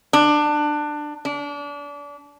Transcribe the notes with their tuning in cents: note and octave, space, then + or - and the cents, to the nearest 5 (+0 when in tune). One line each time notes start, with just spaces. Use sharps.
D4 +20
D4 -30